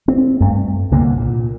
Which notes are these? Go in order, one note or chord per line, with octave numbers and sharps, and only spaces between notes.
C4
G2 A3
C2 D3 A#3
A#2